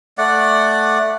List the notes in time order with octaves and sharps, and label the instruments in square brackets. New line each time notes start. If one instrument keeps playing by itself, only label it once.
[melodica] A3 D5 F#5